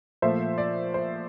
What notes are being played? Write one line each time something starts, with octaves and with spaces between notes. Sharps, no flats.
A#2 F3 A3 C5 E5
D5
C5